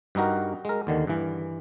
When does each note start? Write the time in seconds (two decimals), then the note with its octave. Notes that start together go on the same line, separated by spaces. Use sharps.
0.15 G2 G3 D#4 F#4 A#4
0.65 G#3 A#4
0.87 D#2 D3 D#3
1.07 G2 E3